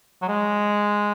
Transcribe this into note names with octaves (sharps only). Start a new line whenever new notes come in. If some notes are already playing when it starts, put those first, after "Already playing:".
F#3
G#3